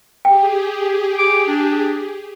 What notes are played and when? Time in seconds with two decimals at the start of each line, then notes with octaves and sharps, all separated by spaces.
0.25 G4 G#4 G5
1.18 D6
1.47 D4